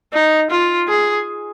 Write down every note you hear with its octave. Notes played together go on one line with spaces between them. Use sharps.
D#4
F4
G#4